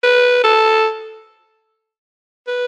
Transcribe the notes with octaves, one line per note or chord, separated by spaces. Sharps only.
B4
A4
B4